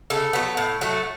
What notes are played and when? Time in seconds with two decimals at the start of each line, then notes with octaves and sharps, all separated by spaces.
0.10 C#3 A4
0.33 F#3 B3
0.57 A2
0.81 F#3 A3